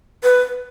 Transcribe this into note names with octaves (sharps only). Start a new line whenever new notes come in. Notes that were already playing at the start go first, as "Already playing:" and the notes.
B4